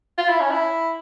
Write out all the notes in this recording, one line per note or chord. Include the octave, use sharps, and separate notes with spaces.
F4
E4
C#4
E4